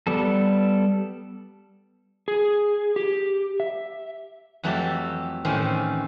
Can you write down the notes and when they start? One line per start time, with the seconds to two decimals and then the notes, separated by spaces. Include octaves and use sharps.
0.07 G3 B3 A4
2.28 G#4
2.96 G4
3.60 E5
4.63 F2 E3 F#3 A3 G4 A4
5.45 A2 D#3 E3 C4 C#4